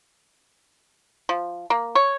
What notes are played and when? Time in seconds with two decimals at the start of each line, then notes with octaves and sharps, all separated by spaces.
1.29 F3
1.70 A#3
1.95 C#5